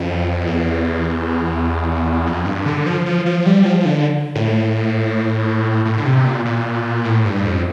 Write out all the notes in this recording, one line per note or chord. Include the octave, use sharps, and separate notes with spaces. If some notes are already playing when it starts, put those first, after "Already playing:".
Already playing: F2
E2
F2
G2
D3
F3
F3
F3
G3
F3
D3
A2
A2
D3
C3
A#2
A#2
A2
G2
F2